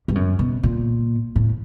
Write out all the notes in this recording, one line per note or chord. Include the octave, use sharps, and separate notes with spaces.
G2
F#2
B2
A#2
A2